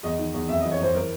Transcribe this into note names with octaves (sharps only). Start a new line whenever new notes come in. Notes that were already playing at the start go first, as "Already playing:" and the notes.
E2 D#5
D#3
E2
F2 E5
D#5
E3
C#5
F2 C5
E3 A#4